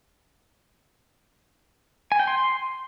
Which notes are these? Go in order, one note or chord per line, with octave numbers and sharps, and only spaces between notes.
G#5
G5
C6